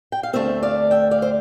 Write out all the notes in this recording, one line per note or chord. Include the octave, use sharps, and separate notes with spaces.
G5
F5
D2 D3 A3 C4 C5 E5
D5 F5
E5 G5
D5 F5
C5